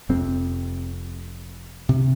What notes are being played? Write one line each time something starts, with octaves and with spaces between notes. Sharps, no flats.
F1 F2 C3 C4
C3